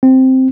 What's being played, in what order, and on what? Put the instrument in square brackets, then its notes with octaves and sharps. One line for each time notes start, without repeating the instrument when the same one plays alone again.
[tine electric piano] C4